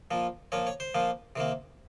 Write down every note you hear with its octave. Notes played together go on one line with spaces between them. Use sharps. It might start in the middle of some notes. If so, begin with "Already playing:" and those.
A#2 F3 A#3
A#2 F3 A#3 C#5
C#5
C5
A#2 F3 A#3
C3 D#3 A#3